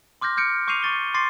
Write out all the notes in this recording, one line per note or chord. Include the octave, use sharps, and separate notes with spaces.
C6 D6 F6 G6 A#6
F6 G6 C#7 D7
C#6 D6 G6 C7 D#7 F7
C#6 A6 G7
C6 D6 A6 C7